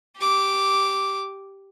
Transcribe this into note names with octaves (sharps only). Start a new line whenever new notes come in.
G4 D6